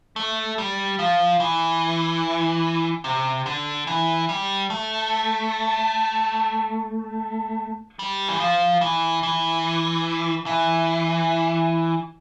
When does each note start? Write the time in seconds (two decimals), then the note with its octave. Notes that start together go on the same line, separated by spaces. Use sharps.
0.16 A3
0.58 G3
0.99 F3
1.40 E3
3.04 C3
3.46 D3
3.87 E3
4.29 G3
4.70 A3
7.99 G3
8.29 E3
8.40 F3
8.81 E3
9.23 E3
10.46 E3